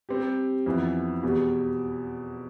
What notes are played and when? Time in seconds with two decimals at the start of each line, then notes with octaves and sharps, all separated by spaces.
0.09 G3 C4 G4
0.66 F2 E3 B3
1.23 E2 B2 G3